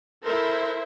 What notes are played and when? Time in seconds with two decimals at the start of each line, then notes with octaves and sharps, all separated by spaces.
0.24 E4 A4 A#4 C5 E5